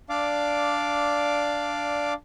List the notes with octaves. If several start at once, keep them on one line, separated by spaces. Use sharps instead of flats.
D4 D5 F5 D6